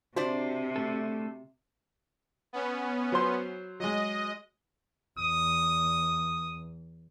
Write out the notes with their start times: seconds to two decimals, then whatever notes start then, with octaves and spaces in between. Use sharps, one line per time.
0.16 C3 D4 F#4 C5 D5
0.76 A3 A4
2.53 B3 C#4
3.12 F#3 C5 C6
3.80 F#3 G#3 D#5
5.19 E2 D#6